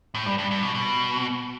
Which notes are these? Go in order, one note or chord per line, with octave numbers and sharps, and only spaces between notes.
A2
G2
G2
G2
B2
B2